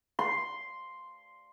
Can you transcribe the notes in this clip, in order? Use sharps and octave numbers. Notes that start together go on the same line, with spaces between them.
C6